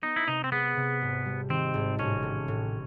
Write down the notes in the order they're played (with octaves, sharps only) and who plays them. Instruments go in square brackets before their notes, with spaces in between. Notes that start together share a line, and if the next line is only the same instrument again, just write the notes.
[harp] B3 [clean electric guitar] D#4
[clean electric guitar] E4
[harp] C3 [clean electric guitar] D#4
[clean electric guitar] C4
[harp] G#3 [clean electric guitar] B3
[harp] C3
G#1
G3
[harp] D#3 [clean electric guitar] C4
[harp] G#1
[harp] A1 [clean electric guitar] C#4
[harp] A2
A2